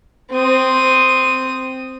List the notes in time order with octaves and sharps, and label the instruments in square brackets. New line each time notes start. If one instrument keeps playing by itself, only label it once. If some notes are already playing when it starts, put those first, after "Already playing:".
[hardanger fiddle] C4 D#6